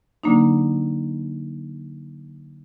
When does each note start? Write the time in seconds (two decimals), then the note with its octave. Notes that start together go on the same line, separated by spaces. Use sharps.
0.24 D3 F#3 A#3 D4 D#4